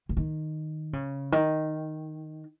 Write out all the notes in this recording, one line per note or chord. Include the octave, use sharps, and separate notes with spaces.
E3
D#3
C#3
D#3